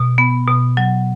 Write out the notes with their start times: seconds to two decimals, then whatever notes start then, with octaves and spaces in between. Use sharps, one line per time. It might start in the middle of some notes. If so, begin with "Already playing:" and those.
Already playing: B2
0.18 B3
0.48 B2
0.77 F#3